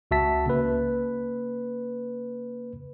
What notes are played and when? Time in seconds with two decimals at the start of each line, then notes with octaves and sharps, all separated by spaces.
0.11 C#2 F#4 E5 A5 B6
0.46 C#3 A#3 B4